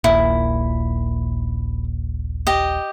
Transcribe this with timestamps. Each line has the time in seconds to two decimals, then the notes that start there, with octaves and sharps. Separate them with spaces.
0.04 D#1 A#1 A#2 E4
2.47 G4 D#5